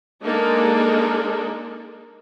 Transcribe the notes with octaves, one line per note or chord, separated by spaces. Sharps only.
G#3 A#3 D4 D#4 A4